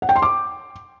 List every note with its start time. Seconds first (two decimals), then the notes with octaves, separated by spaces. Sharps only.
0.02 F#5
0.09 G5
0.16 C6
0.22 D6